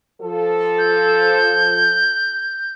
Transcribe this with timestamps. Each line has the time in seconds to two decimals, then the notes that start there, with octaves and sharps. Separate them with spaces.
0.22 F3 A4
0.78 G6